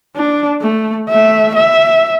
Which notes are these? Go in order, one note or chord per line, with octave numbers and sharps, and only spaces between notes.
D4
A3
A3 E5
E5